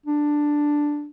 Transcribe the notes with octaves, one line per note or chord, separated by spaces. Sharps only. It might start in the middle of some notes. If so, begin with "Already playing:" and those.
D4